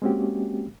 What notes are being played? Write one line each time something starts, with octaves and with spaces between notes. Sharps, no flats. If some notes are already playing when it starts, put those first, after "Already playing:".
G#3 A#3 C4 C#4 F#4 G4